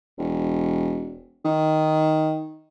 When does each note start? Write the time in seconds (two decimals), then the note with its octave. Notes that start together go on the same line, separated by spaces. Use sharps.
0.18 E1
1.45 D#3